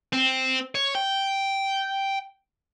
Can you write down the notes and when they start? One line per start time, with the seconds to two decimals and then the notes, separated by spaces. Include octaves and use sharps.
0.13 C4
0.75 C#5
0.95 G5